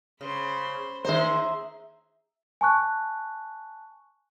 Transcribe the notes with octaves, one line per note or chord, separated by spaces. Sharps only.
C#3 C5 B5
D#3 G#4 C5 E5 A#5
G#5 A5 C#6 F#6